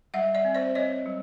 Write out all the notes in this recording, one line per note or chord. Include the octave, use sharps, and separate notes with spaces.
G3 E5 F#5
D5 E5
C4
C5 D5
C4 C#5 D#5
G3